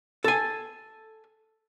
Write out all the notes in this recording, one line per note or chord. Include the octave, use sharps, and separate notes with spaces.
A4 G#5